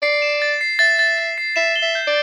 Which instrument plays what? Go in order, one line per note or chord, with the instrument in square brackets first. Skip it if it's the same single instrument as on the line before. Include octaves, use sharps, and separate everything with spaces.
[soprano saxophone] D5 [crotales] C7
[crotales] E7
A6
C7
[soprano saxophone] E5 [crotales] A6
[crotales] A6
A6
C7
[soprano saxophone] E5 [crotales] E7
[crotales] G7
[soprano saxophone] E5
[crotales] G6
[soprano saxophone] D5